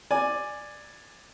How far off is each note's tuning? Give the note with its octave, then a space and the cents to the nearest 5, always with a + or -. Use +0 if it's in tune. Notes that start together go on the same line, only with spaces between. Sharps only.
D5 +10 G#5 +0